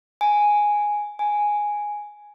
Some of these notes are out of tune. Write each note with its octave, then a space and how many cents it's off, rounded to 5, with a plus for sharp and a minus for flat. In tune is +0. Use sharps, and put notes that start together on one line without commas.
G#5 +0
G#5 +0